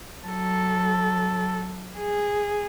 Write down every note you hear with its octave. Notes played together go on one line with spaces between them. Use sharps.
F#3 A4
G#4